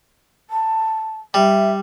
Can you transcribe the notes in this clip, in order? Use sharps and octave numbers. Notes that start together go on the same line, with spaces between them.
A5
G3 E5